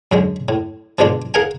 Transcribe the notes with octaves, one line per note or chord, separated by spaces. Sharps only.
F#2 D3 G#3
A2
G#2 B2 D3 G#3 D4 F4
G#4 A#4 F5 F#5 G#5